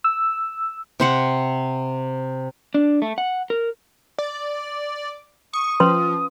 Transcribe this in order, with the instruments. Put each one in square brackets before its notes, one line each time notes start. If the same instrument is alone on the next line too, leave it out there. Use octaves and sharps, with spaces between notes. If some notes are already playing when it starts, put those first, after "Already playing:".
[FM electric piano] E6
[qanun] C3 C5 F#5
[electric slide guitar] D4
A3
F#5
A#4
[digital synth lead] D5
[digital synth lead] C#6 [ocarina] D#6
[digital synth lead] F3 [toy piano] C#4 B4 C6